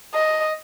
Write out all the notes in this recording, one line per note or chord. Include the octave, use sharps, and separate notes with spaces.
D#5